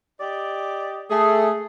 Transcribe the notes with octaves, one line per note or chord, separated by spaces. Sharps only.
G4 D5 D#5
A3 G#4